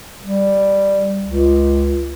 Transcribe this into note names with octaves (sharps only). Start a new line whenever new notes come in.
G3
C#2